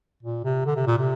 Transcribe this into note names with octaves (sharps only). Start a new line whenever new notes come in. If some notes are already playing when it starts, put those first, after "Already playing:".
A#2
C3
D3
C3
A#2
C3